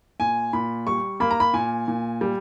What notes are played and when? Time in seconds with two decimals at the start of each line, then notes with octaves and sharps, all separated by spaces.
0.20 A#2 G#5
0.53 A#2 B5
0.87 G3 C#6
1.20 A#3 B5
1.31 A#5
1.40 B5
1.54 A#2 G#5
1.88 A#2
2.21 G3